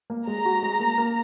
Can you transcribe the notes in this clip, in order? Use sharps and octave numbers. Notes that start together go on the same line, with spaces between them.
A#3
G#3 A#5
F#4
G#3
A#3
A#3